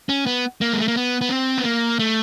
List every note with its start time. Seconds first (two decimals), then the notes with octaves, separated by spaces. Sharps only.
0.09 C#4
0.26 B3
0.61 A#3
0.73 G#3
0.81 A3
0.88 A#3
0.96 B3
1.21 B3
1.30 C4
1.58 B3
1.65 A#3
1.99 A3